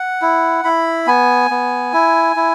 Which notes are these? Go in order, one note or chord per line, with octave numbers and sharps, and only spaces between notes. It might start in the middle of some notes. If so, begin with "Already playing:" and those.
Already playing: F#5
E4
E4 B5
B3 G#5
B3
E4
E4